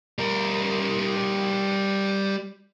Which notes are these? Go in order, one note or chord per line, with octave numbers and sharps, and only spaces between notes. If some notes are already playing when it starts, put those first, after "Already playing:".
G3 A#4